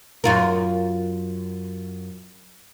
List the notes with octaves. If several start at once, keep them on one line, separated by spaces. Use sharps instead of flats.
F#2 F4 A#4